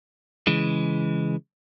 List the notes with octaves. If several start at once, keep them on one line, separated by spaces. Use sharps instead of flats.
C#3 E3 G#3